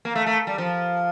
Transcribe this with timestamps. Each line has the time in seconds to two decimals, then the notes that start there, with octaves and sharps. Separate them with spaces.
0.05 A#3
0.16 A3
0.26 A3
0.47 G3
0.58 F3